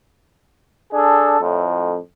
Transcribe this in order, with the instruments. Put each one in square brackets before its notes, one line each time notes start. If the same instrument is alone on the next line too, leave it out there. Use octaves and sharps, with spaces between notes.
[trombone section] D4 G#4 A4
F2 A2